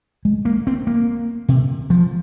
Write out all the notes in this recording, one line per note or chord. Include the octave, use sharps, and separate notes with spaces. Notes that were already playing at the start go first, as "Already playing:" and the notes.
G#3
A#3
C4
A#3
C3
F3